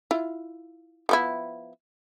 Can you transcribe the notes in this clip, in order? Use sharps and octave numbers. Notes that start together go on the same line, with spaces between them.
E4 F4
F3 B3 E4